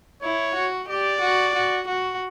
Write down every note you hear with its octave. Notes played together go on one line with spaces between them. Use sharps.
E4 C#5
F#4
G4 D5
F#4
F#4
F#4